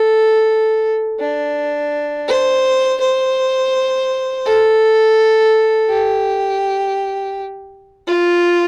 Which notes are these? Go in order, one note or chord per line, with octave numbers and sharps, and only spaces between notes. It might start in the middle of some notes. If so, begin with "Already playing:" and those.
Already playing: A4
D4
C5
C5
A4
G4
F4